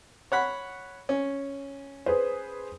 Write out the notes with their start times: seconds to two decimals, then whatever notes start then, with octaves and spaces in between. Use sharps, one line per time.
0.32 C#5 F#5 B5
1.09 C#4
2.06 G#4 B4 C5